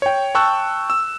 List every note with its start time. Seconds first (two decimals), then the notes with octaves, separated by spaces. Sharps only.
0.02 C#5 G5
0.35 G5 A5 C#6 E6 F#6
0.90 E6